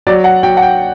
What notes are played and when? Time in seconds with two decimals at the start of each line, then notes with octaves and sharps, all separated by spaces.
0.07 F#3 D5
0.24 F#5
0.43 F#3 G5
0.57 F#5
0.62 G5